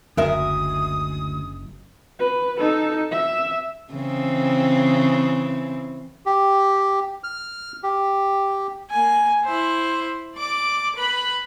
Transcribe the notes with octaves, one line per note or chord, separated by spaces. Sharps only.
F#1 D2 G#3 A#4 E5 D#6
B4
D#4 A4
E5
C#3 E3 C4
G4
F6
G4
A#3 G#5
E4 C5
D5 D6
B4 B5